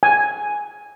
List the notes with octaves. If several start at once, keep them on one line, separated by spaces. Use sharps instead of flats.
G#5